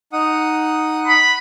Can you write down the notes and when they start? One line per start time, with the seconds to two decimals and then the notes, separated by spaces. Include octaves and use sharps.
0.13 D#4 F#5 D#6
1.07 B5